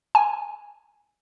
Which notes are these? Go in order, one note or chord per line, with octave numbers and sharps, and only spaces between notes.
G#5